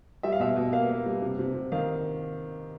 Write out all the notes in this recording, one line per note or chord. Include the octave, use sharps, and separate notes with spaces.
G3 E5
F5
B2 E5
B2
A#3 F5
A#3
G3
C3
C3
C3
D#3 F5